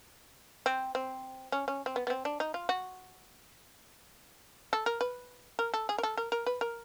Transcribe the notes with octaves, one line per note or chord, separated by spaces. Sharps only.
C4
C4
C#4
C#4
C4
B3
B3
C4
D4
D#4
F4
F#4
A4
A#4
B4
A#4
A4
G#4
A#4
A4
A#4
A#4
B4
A#4